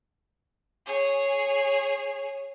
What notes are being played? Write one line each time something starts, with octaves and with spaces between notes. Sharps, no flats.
G#4 C#5